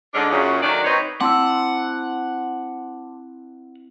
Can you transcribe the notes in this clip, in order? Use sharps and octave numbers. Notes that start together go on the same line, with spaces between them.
G#2 D3 G#3 C#4 D4
F#2 A#2 C#3
D#3 F#3 A3 D4 C#5 D5
C4 D#4 B4 C#5
C4 E4 F#5 A5 C6 D6 E6